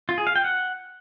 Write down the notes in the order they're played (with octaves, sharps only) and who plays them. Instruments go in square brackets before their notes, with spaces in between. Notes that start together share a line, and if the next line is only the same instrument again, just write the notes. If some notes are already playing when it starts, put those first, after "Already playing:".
[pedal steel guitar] F4
G#4
F5
G5
F#5